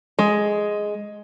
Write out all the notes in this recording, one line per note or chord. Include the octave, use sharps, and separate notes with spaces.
G#3